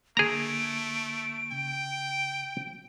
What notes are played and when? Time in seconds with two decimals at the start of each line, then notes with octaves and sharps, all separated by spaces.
0.17 D3 A3 A#3 G#4 A#5 D7
1.52 C#3 G5